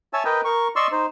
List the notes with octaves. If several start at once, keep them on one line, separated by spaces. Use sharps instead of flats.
C#5 E5 G#5 A5 E6
A#4 B4 D#5 G5
A#4 C#6
D5 D#5 C6 C#6 E6
D#4 C5